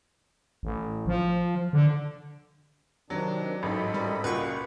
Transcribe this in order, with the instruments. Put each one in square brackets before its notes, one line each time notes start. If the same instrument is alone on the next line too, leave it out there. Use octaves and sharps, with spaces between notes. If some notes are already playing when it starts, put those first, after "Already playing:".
[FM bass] A1
F3
D3
[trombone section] C3 C4 [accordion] D#3 D4 [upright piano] F#3
[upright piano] A1 G#2 [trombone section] F#3 [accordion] A4 D#5 B5
[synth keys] G3 [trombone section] C4 F#4 A#4
[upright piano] C#2 A#2 [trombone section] F4 F#4 [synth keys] B4 C#6